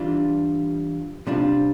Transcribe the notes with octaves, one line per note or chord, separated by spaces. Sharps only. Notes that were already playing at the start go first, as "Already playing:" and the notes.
Already playing: E3 G3 D4 F4
C3 G3 D4 F4